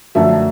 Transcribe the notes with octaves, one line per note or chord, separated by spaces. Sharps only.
F#2 D3 F3 A3 E5